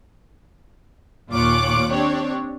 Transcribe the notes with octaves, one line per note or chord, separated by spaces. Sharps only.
D#2 A#2 F4 C#5 D6 F#6
C4 D4 G4 C#5